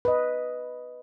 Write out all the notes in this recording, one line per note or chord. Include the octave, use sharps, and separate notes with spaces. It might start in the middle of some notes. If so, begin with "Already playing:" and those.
B4 D#5